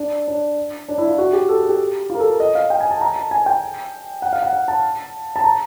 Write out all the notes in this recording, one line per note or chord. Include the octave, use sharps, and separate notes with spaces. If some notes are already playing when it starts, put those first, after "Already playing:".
Already playing: D4
D4
D4
E4
F4
F#4
G4
A4
G#4
G4
F4
A#4
A4
A#4
D#5
F5
G5
G#5
A5
A#5
A5
G#5
G5
F#5
F5
F#5
F#5
A5
A5
A#5